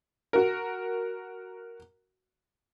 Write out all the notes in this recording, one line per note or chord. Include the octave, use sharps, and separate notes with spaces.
F#4 A#4